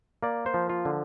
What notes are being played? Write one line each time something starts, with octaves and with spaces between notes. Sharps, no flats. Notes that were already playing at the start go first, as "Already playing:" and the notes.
A#3 D5
C5
F3
F4
D3